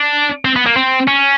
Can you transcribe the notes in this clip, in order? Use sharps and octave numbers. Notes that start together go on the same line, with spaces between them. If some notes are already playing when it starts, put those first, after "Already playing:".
Already playing: D4
C4
B3
A#3
C4
C#4